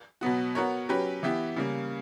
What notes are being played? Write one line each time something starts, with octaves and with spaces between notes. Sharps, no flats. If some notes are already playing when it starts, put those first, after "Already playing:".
B2 F#3 B3 F#4
B3 F#4 A#4 C#5
F#3 C#4 G4 B4
E3 B3 E4 G4
C#3 G3 A#3